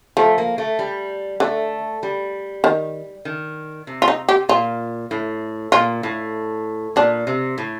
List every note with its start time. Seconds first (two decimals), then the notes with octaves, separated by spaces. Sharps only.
0.17 F3 A3
0.38 A#3
0.58 A3
0.79 G3
1.40 D3 A3
2.03 G3
2.64 D#3
3.25 D#3
3.87 C3
4.02 F4
4.08 D#4
4.29 G4
4.49 A#2 F4
5.11 A2
5.72 A#2 F4
6.03 A2
6.96 A#2 D4
7.27 C3
7.58 A2